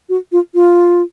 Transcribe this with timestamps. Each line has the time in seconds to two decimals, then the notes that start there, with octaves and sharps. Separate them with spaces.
0.09 F#4
0.32 F4
0.54 F4